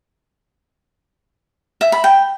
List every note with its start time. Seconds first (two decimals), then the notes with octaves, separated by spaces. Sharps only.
1.81 E5
1.92 B5
2.04 G5